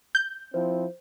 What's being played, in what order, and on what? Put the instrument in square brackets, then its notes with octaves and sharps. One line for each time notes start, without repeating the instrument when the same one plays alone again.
[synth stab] G6
[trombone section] F3 C4 E4 [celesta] C5